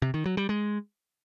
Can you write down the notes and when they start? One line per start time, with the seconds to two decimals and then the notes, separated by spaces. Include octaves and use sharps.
0.02 C3
0.14 D#3
0.26 F#3
0.37 G3
0.49 G#3